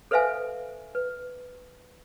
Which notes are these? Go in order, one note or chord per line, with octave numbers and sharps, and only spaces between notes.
A4 B4 C5 E5 F5 G#5
B4